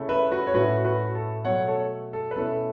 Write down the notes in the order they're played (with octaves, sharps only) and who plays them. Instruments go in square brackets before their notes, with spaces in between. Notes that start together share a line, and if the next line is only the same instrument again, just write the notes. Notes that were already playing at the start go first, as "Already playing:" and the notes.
Already playing: [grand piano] C#3 A3 C#4 E4
B4 E5
F#4 B4
C#5
A2 A3 C#4 E4 F#4 B4
F#4 B4
A4
B2 F#3 A3 C#5 F#5
A4 C#5
A4
B4
B2 A3 C#4 E4 A4